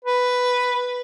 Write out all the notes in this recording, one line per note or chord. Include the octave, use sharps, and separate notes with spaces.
B4